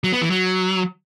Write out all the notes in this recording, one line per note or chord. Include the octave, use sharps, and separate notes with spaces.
F#3
B3
E3
F#3